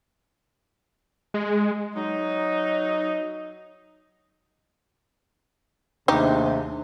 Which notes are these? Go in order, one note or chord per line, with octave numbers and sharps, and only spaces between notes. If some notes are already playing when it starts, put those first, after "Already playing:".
G#3
F#3 D#4
D#2 C3 G#3 A3 D4 D#4 G4